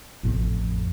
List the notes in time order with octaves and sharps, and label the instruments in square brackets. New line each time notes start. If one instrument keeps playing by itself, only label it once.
[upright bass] A1 F2